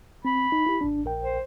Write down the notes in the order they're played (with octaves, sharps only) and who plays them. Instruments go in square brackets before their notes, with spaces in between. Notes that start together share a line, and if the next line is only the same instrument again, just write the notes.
[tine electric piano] C4 [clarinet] B5
[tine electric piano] D#4
E4 G4
G#1 D4
A#1 A#4 G5
[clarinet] C5